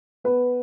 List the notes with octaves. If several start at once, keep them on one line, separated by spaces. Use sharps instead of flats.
B3 B4